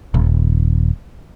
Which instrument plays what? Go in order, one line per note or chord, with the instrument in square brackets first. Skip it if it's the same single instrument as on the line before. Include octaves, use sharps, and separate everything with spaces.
[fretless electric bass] D#1